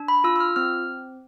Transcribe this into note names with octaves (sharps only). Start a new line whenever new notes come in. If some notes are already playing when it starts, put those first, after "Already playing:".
Already playing: D4
B5
F4 E6
E6
F6
C4 F6